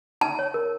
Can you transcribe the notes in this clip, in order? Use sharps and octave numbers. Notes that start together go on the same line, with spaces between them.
D#4 A5
C#5
A#4